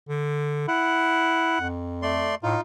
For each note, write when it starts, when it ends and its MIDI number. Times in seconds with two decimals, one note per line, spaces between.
0.09 0.66 50
0.68 1.57 64
0.68 1.68 78
1.61 2.32 41
2.02 2.35 57
2.02 2.35 74
2.02 2.35 84
2.43 2.56 45
2.43 2.61 63
2.43 2.61 65